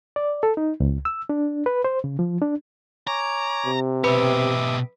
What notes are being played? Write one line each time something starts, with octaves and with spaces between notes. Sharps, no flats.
D5
A4
D#4
C#2
E6
D4
B4
C5
C#3
F3
D4
C#5 G#5 A#5 D6
C3
B2 G4 B4 E5 B5 D6 D#6